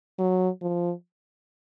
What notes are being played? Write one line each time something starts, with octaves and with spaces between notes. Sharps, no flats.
F#3
F3